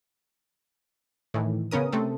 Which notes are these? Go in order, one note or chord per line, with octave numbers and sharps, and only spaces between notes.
A2 D#3 E3
C#3 B3 C#4 A#4 D#6
C3 A3 C4 A4